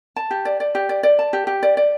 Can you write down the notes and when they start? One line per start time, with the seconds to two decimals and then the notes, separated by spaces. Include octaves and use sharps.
0.16 A5
0.31 G4
0.45 D5
0.60 D5
0.75 G4
0.89 D5
1.03 D5
1.19 A5
1.33 G4
1.47 G4
1.63 D5
1.77 D5